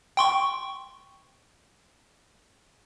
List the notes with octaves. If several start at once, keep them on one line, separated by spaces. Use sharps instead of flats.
G5 C6 C#6